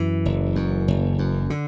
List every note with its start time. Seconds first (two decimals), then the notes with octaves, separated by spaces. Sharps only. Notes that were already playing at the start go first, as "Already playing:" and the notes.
Already playing: F#2 E3
0.25 F#1
0.56 F#2
0.88 F#1
1.19 F#2
1.50 D3